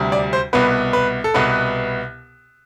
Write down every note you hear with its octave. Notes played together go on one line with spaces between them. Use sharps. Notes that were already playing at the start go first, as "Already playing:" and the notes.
Already playing: D2 C3 G3
D5
C5
C2 B2 B3 B4
B4
A4
C2 B2 B3 B4